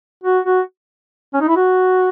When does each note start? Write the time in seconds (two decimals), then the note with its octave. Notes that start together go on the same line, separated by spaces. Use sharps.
0.24 F#4
0.45 F#4
1.34 C#4
1.41 D#4
1.48 E4
1.56 F#4